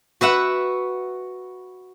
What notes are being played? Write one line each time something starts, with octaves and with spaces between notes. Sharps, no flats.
F#4 B4 E5 F#5